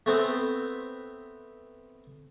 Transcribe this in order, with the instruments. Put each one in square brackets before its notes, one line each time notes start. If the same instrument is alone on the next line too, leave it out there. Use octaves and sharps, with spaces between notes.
[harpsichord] A3 B3 C4